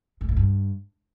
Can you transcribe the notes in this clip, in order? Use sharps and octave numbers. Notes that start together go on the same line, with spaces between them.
G#2
A2
G2